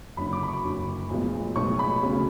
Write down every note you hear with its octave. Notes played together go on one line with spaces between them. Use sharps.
F#1 F#2 D3 F#3 B5
D6
B5
C#6
F#1 F#2 D3 F#3
B1 A2 F3 G#3 B3
B1 A2 F3 G#3 B3 C#6
B5
D2 C#3 F#3 B3